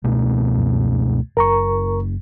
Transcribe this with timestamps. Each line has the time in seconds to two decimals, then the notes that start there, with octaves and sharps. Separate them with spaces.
0.04 C#2 B2 A3
0.57 F#2
1.37 F#1 A#4 A#5 C#6